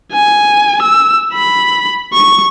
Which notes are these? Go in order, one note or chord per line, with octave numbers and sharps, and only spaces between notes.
G#5
E6
B5
C#6